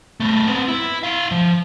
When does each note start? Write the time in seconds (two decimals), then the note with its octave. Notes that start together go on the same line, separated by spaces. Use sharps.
0.20 A3 B3
0.47 B3 C4
0.68 E4
1.03 E4 F5
1.31 F3